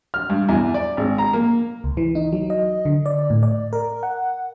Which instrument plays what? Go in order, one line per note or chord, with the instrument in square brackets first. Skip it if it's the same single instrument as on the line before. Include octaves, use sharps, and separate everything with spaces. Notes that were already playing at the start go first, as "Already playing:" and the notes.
[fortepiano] F6
G2
E2
D5
G#1
A#5
A#3
[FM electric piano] C#2
E3
D#4
F#3
D#5
D3
D5
A2
D5
A#4
F#5